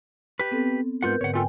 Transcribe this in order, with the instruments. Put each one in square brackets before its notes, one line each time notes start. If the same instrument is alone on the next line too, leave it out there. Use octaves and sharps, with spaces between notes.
[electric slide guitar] G4 B4
[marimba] B3 C4 A4
[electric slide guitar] G#2 F4 F#5 [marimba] A#4 B4 G6
[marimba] G#2 D3 [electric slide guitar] C#5 F#5
[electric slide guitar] A3 F4 A4 [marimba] G5 G#5